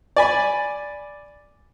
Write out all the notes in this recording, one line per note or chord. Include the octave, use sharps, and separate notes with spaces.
D5 G#5 B5